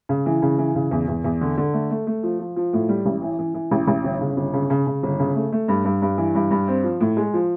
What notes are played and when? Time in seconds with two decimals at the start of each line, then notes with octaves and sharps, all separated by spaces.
0.09 C#3
0.26 E3
0.42 C#3
0.58 E3
0.75 C#3
0.91 E2
1.08 E2
1.24 E2
1.41 D3
1.57 D3
1.74 A3
1.91 A3
2.07 A3
2.23 F3
2.39 F3
2.56 F3
2.73 A2
2.89 G3
3.06 A1
3.22 E3
3.39 E3
3.54 E3
3.71 A1
3.88 A1
4.04 G1
4.21 C#3
4.37 G1
4.54 C#3
4.70 C#3
4.87 C#3
5.03 G1
5.20 C#3
5.36 A3
5.52 A3
5.68 G2
5.85 G2
6.02 G2
6.18 E3
6.35 G2
6.51 G2
6.68 C4
6.84 F3
7.01 A2
7.17 G#3
7.34 F3